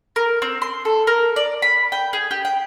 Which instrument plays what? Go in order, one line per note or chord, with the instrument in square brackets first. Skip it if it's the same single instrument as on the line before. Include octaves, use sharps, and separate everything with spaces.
[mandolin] A#4
C4
C6
A4
A#4
D5
B5
G5
G#4
G4
G5